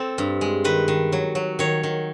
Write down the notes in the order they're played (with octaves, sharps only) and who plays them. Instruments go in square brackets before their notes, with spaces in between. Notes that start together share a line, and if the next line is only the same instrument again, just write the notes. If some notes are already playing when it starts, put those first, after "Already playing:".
Already playing: [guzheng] C4 A4
G2
G#3
D#3 B4
D#3
F#3
F#3
D#3 C#5
D#3